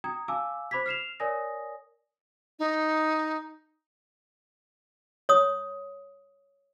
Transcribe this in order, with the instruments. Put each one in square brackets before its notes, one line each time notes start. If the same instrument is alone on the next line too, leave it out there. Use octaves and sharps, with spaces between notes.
[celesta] G5 A#5 D#6 G#6
F5 G#5 A5 D6 E6
C5 B5 D6 G#6 B6
F6 C7 E7 F7
A#4 C#5 D5 G#5 D#6 A#6
[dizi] D#4
[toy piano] C#5 D#6